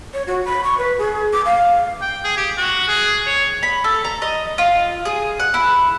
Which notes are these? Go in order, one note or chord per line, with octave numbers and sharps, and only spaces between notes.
C#5
F#4
B5
C#6
B4
G#4
D6
F5
G5
G#4
G4
F#4
G#4
C#5
B5
A4
A#5
D#5
F4
G#4
F#5
E4